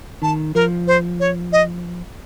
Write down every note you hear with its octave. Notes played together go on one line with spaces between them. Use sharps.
D#3 A5
F3 A#4
C5
C#5
D#5